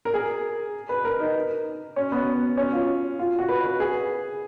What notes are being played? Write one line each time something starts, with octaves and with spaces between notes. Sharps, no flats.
A#4
G#4
B4
A#4
D#4
C#4
B3
C#4
F4
F4
F#4
B4
B4
G#4